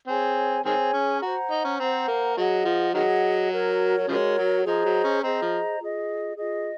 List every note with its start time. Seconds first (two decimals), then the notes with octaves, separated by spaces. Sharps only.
0.07 C4 G#4 C#5 G#5
0.65 D#3 G#3 C4 G#4 C#5 G#5
0.93 C#4
1.22 F#4 C5 F#5 A#5
1.51 D#4
1.65 C#4
1.80 C4 C5 F#5 A#5
2.08 A#3
2.36 F#3 G#4 D#5 F#5
2.65 F3
2.94 D#3 F#3 G#4 D#5 F#5
3.51 F#4 A#4 C#5
3.98 F#3
4.08 C#3 F3 G#3 F#4 A#4 C#5
4.37 F#3
4.65 F3 G#4 C5 D#5 A#5
4.85 F#3
5.04 C#4
5.22 C4 G#4 C5 D#5 A#5
5.41 F3
5.80 F4 G#4 D#5
6.37 F4 G#4 D#5